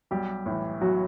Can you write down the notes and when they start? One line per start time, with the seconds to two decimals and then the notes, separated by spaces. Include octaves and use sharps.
0.11 B1 G3 G4
0.46 A2 E3
0.81 B1 F#3 F#4